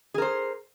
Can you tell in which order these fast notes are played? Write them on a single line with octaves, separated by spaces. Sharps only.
G#4 A#4 C5